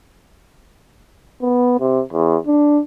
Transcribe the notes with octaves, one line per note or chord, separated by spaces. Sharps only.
B3
C3
E2
D4